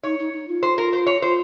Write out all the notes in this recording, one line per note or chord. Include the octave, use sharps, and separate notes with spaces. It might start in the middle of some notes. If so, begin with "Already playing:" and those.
D#4 C#5
D#4
D#4
F4
C5
A#4
C5
C#5
F4 C5